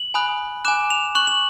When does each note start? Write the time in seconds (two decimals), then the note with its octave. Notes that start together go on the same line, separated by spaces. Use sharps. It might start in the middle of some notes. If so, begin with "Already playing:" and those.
Already playing: F#7
0.14 G#5 B5 D#6 F#6
0.65 G#5 B5 D6 F#6 E7
0.90 F7
1.15 C#6 F#6 F#7
1.27 F#7